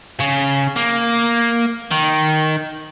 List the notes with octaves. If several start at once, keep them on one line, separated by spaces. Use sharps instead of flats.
C#3
A#3
D#3